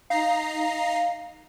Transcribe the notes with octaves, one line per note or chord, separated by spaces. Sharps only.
D#4 F5 A#5 C7